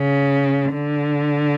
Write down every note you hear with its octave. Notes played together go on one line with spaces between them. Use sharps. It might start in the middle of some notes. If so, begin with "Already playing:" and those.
Already playing: C#3
D3